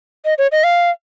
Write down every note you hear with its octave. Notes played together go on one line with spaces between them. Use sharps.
D#5
C#5
D#5
F5